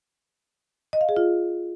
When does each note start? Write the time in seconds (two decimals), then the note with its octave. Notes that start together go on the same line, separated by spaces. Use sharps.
0.93 D#5
1.01 F5
1.09 G#4
1.17 F4